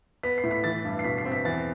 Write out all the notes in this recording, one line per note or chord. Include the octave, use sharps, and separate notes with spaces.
B3 B6
C7
A2
B6
E3 A6
G2
C7
B2 B6
C7
C4
B6
E2 A6